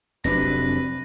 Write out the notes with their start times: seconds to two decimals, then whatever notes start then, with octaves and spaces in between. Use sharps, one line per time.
0.24 F1 C3 F#3 D4 B4 A#6